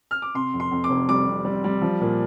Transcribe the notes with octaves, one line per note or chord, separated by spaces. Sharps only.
F6
D6
C3 C6
F2
C6
F2
D6
F1
G3 D6
C3
G3
G3
F3
A#2